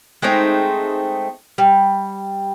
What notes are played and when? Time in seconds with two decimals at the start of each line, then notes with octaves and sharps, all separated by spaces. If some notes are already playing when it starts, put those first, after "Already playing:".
0.22 G#3 A3 C4 D#4
1.58 G3